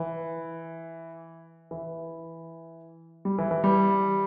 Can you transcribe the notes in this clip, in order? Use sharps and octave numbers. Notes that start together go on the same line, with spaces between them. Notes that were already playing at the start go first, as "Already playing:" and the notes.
Already playing: E3
E3
G3
E3
E3
G3